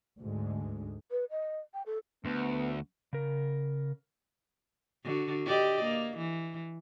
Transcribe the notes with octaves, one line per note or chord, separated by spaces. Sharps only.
D2 G#2 D3 G#3
B4
D#5
G5
A4
D2 B3
C#3 A#4
D3 F#4
G4 D5 D#5
A#3
E3